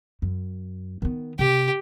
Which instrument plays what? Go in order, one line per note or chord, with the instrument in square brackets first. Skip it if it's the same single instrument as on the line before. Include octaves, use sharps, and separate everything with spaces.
[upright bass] F#2
D#3 B3
[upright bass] C3 [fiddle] G4